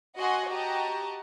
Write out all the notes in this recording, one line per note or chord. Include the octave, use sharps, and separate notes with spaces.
F#4 D#5 F#5 G#5 C6
F#4 G4 D#5 A5 A#5